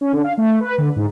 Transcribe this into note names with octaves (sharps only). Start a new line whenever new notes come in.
C#4
D3
F5
A3
B4
D3
G#2